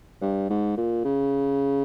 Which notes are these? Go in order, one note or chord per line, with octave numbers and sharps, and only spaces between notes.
G2
G#2
A#2
C#3